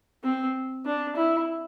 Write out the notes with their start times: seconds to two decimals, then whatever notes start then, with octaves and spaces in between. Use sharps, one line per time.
0.24 C4
0.86 D4
1.16 E4